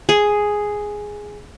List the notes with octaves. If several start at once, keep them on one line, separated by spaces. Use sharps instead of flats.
G#4